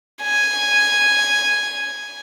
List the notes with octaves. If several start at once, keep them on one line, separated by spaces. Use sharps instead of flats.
G#5